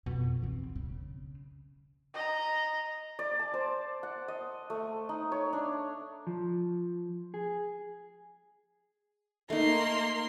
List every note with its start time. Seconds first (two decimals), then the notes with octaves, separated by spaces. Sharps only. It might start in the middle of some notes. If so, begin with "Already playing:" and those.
0.06 F2 B2
0.42 E2 C4
0.76 C#3
2.14 D#5 A#5
3.19 D5
3.39 A5
3.54 C5
4.03 F#5
4.28 D#5
4.70 A3
5.09 D#4
5.32 C#5
5.53 D4
6.27 F3
7.34 G#4
9.50 A3 A#3 D#4 C6